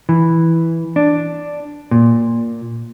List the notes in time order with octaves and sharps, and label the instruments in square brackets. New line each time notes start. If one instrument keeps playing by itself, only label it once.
[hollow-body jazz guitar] E3
D4
A#2